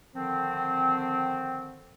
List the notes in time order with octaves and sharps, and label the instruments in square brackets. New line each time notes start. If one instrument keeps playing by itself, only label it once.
[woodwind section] D3 D#3 F3 C4